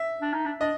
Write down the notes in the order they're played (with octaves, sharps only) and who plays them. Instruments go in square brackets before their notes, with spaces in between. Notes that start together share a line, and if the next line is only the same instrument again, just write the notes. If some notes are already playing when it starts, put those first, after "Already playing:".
Already playing: [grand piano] E5
[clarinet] D4
D#4
D4
[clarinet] D4 [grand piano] D#5